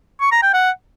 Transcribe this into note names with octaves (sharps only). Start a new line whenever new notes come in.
C#6
A#5
G5
F#5